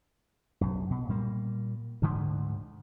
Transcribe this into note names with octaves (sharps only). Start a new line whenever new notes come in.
B1 F#2
B2
A#2 G3 A#3
D2 G#2 D3